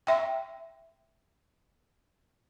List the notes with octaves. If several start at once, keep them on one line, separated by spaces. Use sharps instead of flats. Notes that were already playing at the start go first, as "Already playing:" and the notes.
E5 G5